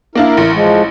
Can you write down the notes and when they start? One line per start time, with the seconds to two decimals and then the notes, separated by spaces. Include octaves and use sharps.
0.15 A#3 D4 E4 A#4 F5
0.37 A1
0.53 F3 G#3